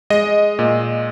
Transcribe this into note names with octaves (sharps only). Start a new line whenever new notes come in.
G#3 D#5
A#2